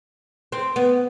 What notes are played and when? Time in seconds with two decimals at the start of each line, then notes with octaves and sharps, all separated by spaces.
0.52 C4
0.76 B3